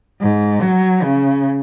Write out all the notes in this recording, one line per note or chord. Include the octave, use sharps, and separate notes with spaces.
G#2
F#3
C#3